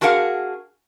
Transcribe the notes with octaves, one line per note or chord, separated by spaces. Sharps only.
D4 F#4 G#4 A#4 F5 F#5